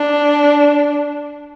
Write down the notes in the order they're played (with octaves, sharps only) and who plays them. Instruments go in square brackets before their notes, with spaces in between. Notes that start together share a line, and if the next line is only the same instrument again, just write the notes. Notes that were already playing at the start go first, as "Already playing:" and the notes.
Already playing: [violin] D4